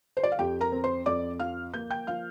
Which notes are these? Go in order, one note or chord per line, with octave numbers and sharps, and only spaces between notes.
C5
D5
F5
F2 G4 G5
A#4 A#5
C4
C5 C6
F2 D5 D6
F3 F5 F6
A#3 G6
G5 G6
F3 F5 F6